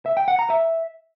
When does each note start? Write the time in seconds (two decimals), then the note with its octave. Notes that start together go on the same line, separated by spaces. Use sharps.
0.06 E5
0.17 G5
0.28 F#5
0.39 A#5
0.50 E5